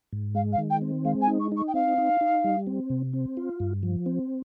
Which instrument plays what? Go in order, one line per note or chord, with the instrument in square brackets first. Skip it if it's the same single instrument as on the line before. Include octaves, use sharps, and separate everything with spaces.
[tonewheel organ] G#2
[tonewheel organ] G#3 [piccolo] F5
[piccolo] F5
[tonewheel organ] D#3
[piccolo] G5
[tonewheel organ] C4
[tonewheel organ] G#3 [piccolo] F5
[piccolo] G#5
[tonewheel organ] D#4
[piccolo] C#6
[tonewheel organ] D#4
[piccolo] C#6
G5
[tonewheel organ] C4 [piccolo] F5
[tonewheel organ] D#4
D#4
G3
C4
C3
C4
F4
G2
F3
C4